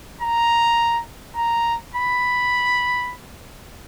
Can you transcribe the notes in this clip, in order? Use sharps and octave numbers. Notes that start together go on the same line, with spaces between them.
A#5
A#5
B5